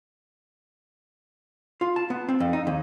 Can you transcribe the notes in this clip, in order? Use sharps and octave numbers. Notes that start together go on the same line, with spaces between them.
F4
A5
B3
C4
F2
D#4
D#2